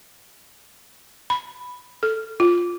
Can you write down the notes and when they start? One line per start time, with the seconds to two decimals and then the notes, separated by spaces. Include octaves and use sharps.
1.30 B5
2.03 A4
2.40 F4